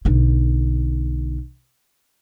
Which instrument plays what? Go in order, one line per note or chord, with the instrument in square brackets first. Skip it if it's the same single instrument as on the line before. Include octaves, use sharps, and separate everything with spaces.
[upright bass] B1 D3